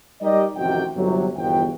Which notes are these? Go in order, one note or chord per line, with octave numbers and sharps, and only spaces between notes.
G3 D#4 G4 A#4 D5 D#5
A1 F2 C3 D#3 F#4 G5
G1 C3 F#3
G1 E2 B2 F3 G5